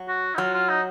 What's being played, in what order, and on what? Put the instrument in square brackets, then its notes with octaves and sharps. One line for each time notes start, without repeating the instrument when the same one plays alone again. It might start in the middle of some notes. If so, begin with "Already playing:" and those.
Already playing: [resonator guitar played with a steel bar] F#3
[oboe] F#4
D#4
[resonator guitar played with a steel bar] F#3 [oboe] F4
[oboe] F4
D#4